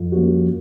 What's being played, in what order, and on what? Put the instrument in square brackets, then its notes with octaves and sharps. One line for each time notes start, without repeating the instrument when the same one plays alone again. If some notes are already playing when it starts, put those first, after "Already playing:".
Already playing: [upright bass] F2
[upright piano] G3 A#3 C#4 F#4